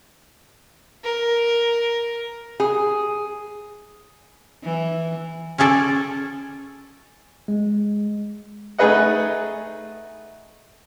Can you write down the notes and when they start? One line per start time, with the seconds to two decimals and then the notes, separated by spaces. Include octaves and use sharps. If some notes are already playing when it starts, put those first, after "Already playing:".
1.04 A#4
2.60 G#4
4.64 E3
5.58 C#4 F4 G#4 A4 D5
7.48 G#3
8.78 A3 D#4 G#4 B4 D#5 F#5